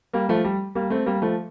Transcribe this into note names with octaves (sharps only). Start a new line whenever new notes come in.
G3 A#3
F3 A3
G3
G3 A#3
A3 C4
G3 A#3
F3 A3